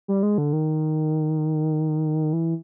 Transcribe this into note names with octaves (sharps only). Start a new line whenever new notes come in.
G3
G#3
D3
D#3
E3